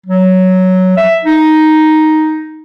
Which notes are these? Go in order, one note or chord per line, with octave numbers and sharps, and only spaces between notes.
F#3
E5
D#4